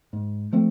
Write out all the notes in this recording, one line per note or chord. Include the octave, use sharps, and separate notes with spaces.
G#2
F3 A3 C4